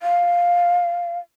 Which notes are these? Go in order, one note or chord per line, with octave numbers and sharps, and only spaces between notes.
F5